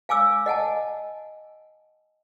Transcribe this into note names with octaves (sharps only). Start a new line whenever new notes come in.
F5 G#5 D6 E6
D#5 F#5 G#5 A5